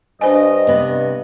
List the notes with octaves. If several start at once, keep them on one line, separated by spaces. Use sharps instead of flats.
G2 D4 C5 D#5 G#5
C3 B3